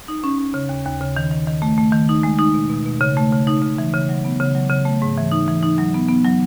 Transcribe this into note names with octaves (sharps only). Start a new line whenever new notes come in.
D#4
C#4
C#4
C#3
D#2
D#2
C#3
D#3
D#3
D#3
A3
A3
D#3
D#4
G#3
D#4
B2
B2
B2
C#3
A3
C#3
D#4
C#3
E3
C#3
F#3
B3
C#3
F#3
C#3
A3
G#2
E3
D#4
E3
D#4
F#3
B3
B3
F#3